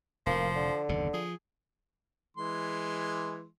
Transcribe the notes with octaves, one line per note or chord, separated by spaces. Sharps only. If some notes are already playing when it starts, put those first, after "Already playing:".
F1 A2 F3 A#3
D3
F#1 D#2 B2
F3 G#4
E3 G#3 C6